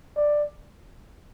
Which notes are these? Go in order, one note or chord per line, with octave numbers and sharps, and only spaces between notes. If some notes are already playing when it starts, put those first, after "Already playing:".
D5